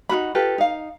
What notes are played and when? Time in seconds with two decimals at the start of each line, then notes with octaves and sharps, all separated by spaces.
0.09 D#4 F4 F#4 B5
0.35 F4 G4 A4 B4
0.58 D#4 F5